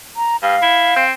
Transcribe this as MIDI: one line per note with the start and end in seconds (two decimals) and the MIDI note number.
0.16 0.36 82
0.43 0.56 43
0.43 1.04 77
0.62 0.95 64
0.96 1.11 60